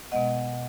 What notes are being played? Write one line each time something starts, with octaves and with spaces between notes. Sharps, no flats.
B2 G#3 B3 D#5 F#5